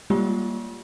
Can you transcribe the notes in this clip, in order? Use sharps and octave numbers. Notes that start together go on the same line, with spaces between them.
G3 G#3 A#3 F4 G4